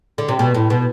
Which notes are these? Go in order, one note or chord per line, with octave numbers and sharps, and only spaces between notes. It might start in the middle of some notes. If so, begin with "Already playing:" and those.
D3
C3
B2
A2
B2